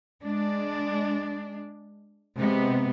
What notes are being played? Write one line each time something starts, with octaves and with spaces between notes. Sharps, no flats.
G#3 D4
C3 G#3 B3